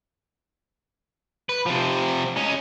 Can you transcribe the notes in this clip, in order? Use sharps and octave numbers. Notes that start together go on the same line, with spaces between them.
B4
C3 F3
G#3 C#4